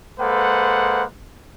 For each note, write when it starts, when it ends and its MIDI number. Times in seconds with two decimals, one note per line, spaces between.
0.20 1.04 56
0.20 1.04 58
0.20 1.04 69
0.20 1.04 71
0.20 1.04 72
0.20 1.04 78